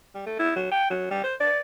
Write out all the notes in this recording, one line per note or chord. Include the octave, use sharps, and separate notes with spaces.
G3
A3
E4
F#3
G5
F#3
G3
C5
D5